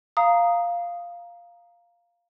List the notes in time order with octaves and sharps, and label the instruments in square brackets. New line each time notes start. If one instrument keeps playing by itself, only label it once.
[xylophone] F5 A#5 D#6